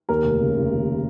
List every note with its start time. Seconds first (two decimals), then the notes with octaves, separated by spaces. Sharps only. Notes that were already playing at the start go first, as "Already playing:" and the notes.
0.09 D#2 A#4
0.25 F1
0.40 C#3
0.56 F1
0.72 D#2